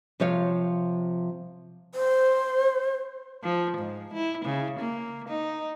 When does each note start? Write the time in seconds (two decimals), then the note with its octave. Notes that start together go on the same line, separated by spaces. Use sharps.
0.20 C3 F3 C#5 F5
1.95 C5
3.43 F3
3.77 G#2
4.13 E4
4.45 C#3
4.79 A#3
5.28 D#4